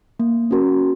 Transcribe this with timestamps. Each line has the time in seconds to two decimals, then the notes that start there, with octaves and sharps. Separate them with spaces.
0.20 A#3
0.51 C#4 F#4 A#4